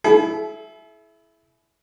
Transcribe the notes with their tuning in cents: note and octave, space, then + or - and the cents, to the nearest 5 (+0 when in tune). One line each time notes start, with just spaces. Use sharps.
E4 +0 G#4 +45